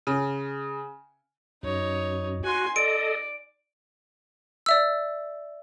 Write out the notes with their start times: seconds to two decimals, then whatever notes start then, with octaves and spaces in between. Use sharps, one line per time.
0.07 C#3
1.63 F#2 D#4 C#5
2.44 F#4 G#5 C6
2.76 A4 D5 D#5 D7
4.66 D5 E5 E6